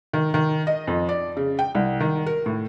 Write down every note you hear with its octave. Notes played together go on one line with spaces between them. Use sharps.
D#3
D#3
D#5
F2
D5
C#3
G5
C2
D#3
A#4
A2